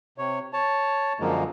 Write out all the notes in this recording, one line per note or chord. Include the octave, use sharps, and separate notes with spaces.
C3 C#5
C#5 A5
F#2 D3 F3 G#3 A#3